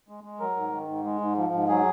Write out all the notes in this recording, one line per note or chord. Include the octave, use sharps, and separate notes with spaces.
G#3
G#3
F#3 A#4
G#2
D#3
G#2
G#3
G#2
F3
G#2
F#3 G#4